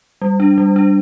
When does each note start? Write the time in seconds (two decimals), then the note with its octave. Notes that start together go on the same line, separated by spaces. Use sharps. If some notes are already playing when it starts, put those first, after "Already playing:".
0.22 G3
0.40 D4
0.58 G3
0.76 D4